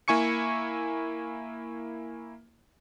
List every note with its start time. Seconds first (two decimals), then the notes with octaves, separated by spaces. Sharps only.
0.08 A#3 E4 G#5 C#6 C#7